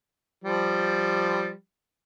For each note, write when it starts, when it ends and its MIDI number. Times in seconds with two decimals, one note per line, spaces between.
0.44 1.52 53
0.44 1.52 55